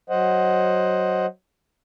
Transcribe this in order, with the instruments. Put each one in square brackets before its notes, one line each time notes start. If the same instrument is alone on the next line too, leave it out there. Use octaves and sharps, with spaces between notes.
[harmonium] F#3 C5 D#5 F#5